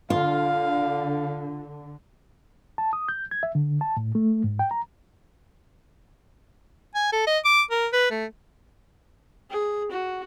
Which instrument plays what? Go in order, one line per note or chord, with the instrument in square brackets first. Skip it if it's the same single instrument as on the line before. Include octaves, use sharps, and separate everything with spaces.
[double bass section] D3 [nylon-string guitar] F4 [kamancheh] F5
[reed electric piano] A5
D#6
G6
G#6
E5
D3
A5
A2
A3
G#2
G5
A#5
[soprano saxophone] G#5
A4
D#5
D6
A#4
B4
A3
[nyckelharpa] G#4
F#4